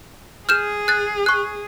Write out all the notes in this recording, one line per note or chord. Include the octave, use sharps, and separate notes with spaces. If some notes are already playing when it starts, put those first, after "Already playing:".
G#4 F6 G6 E7
F#6 A6
C#6 F#6